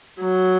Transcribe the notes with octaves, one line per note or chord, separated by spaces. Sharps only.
F#3